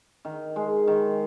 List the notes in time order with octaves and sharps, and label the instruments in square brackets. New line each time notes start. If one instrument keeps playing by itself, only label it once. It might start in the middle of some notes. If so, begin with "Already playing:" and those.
[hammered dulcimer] D#3
G#3
D#3